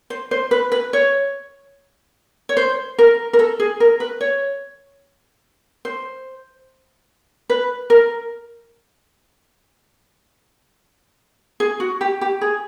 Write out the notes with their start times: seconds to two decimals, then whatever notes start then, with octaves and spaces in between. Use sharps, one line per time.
0.10 C5
0.31 C5
0.51 B4
0.72 B4
0.93 C#5
2.49 C#5
2.57 C5
2.98 A#4
3.33 A#4
3.39 A4
3.60 G#4
3.80 A#4
4.00 B4
4.21 C#5
5.85 C5
7.49 B4
7.90 A#4
11.60 G#4
11.80 F#4
12.01 G4
12.21 G4
12.41 G#4